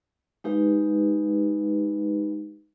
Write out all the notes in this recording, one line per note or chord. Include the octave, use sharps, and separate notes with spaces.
G#3 D#4 G4 B4 F5